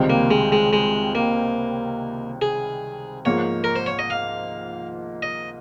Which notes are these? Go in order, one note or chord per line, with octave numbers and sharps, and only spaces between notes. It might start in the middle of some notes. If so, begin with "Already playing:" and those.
Already playing: C#2 C3 D#3 G3 C4
A#3
G#3
G#3
G#3
A#3
G#4
G#2 F3 A#3 C#5
A#4
C5
C#5
D#5
F5
D#5